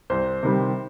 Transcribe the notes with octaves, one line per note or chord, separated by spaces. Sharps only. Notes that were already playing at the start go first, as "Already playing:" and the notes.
C2 C5
C3 D#3 G3